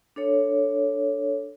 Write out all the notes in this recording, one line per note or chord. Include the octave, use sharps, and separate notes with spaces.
D4 A4 C#5